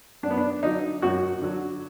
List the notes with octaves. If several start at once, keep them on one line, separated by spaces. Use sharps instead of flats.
F#2 D4
B3
D4
D3 F#3 D#4
F#2 F#4
D3 F#3